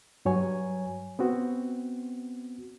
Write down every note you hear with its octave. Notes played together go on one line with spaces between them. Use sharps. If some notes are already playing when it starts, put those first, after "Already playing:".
G2 F#3 C#5 G#5
B3 C4 F#4